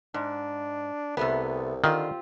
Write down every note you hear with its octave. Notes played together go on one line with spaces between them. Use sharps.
G#2 D4
C2 C3 A3 B3
D3 D#3 C4 F4 G4